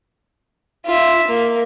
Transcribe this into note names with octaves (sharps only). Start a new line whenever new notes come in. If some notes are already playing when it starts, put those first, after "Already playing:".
F4 E5
A#3